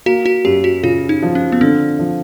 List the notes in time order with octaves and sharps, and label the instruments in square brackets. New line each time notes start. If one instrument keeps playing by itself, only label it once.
[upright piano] A#3 [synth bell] F#4
[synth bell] F#4
[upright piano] F#2 [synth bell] G4
[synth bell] F#4
[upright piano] C#3 [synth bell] F4
[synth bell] D#4
[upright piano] F3
[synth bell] C#4
B3
[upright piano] D3 [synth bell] C4
[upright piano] F3